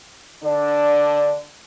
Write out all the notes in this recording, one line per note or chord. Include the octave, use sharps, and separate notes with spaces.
D3 D4